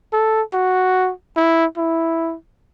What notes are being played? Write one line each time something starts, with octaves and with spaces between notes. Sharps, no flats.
A4
F#4
E4
E4